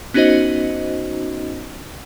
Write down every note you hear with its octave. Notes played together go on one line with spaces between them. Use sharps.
B3 C#4 D#4 F#4 C5 D#5